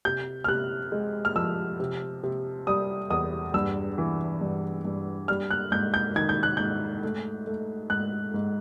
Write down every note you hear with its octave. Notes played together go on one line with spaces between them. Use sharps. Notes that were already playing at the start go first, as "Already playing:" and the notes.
C3 G6
F6
C3 F#6
G#3
F6
F3 E6
C3
C3
G3 D#6
E2 D#6
G2 E6
E3
G2
G2
G3 F6
F#6
G#2 G6
G6
D#3 G#6
G6
F#6
G#2 G6
A3
A3
G#2 F#6
G#2